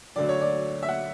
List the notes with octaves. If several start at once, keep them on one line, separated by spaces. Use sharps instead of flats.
D2 D3 F#3 D5
C#5
D5
E5
F#5